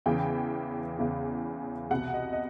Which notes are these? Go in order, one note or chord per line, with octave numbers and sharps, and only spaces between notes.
E2 C#3 E3 G5
E2 C#3 E3
C2 B2 F#5
D#5
D#5